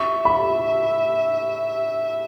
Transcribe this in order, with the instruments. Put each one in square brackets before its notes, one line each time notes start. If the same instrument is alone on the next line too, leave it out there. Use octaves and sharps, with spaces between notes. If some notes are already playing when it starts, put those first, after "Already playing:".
Already playing: [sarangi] E5 [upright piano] C#6
[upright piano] B5